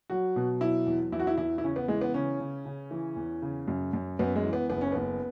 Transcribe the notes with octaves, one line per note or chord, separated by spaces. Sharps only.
F#3 F#4
B2
F#3 E4
E2
E2 E4
F#4
E4
E2 E4
E4
C#3 C#4
B3
E3 G#3
B3
C#3 C#4
C#3
C#3
E3
E2
C#3
F#2
F#2
F#2 B3
G#3
E3
B3
F#1 B3
C#4
F#1 B3